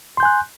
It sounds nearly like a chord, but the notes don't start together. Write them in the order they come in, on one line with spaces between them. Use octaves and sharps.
C6 G6 G#5 F#6